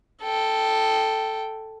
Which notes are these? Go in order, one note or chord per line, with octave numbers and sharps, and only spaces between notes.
A4 G5